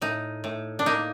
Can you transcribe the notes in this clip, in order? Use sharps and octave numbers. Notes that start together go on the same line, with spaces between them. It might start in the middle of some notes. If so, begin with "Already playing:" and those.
A2 D#4
A2
D4
A#3 D#4